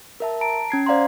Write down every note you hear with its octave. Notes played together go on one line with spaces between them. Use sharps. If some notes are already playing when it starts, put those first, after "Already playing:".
A#4 E5 A5
A5 A#5 D7
C#4 G#6 C7
C5 D5 F5 F#5 A#5 C6